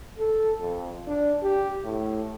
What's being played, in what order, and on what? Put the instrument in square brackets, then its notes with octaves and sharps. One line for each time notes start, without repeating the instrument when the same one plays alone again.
[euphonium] A4
F2
D4
G4
A2